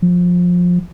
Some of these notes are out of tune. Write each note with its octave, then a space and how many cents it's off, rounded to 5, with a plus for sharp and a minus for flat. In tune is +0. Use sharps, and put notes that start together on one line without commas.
F3 +20